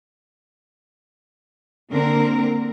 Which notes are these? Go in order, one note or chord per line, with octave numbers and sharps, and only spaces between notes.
D3 A#3 C4 A#4